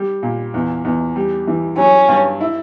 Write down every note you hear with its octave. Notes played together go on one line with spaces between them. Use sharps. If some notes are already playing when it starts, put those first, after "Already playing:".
Already playing: G3
A#2
E2
E2
G3
E3
F#3 C#4
G2
E4